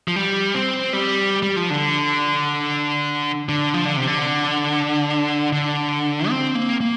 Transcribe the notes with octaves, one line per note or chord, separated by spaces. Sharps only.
F3
G3
C4
G3
G3
F3
D3
D3
F3
D3
C3
D3
D3
C4
A#3
A#3